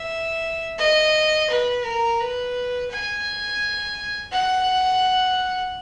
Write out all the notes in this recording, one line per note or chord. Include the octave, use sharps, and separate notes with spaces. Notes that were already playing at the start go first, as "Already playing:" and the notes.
Already playing: E5
D#5
B4
A#4
B4
G#5
F#5